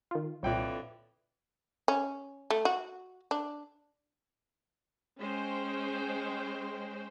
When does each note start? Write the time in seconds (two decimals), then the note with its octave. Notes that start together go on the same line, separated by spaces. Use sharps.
0.11 D#3 F4
0.43 C2 F2 A#2 D3 E3 C#5 G5
1.88 C#4
2.50 A3
2.65 F#4
3.31 D4
5.18 G#3 C#4 C5 G5